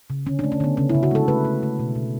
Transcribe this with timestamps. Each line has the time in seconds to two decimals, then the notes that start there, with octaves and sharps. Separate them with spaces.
0.10 C#3
0.26 D3 C#4
0.39 D4
0.44 A3
0.52 C#4
0.60 D3 B3
0.77 C#3 C#4
0.89 E4
0.95 C#3
1.03 F#4
1.11 G#3 A4
1.28 A3 B4
1.45 A3
1.63 A3
1.79 B2
1.96 B2